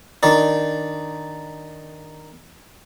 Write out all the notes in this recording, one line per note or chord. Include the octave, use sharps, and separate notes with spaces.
D#3 D4